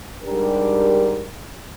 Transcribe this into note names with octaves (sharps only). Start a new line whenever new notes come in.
G#2 G3 D4 G4 A#4